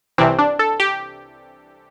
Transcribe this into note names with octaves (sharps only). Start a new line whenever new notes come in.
C2 C3 E3 C4
D4
A4
G4